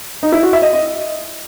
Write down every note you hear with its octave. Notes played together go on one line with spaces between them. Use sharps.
D#4
E4
F#4
E5
D#5
D#5